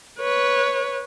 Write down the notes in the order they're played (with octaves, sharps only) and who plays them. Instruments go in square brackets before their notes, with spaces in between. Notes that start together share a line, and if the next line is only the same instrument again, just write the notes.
[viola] B4 C#5